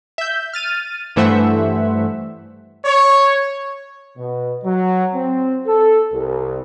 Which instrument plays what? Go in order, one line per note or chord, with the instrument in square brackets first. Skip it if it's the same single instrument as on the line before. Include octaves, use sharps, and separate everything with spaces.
[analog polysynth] E5 G6
F6 A6 D#7
G2 E3 A3 C5 E5 F#5
[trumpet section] C#5
[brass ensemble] B2
F#3
C4
A4
C2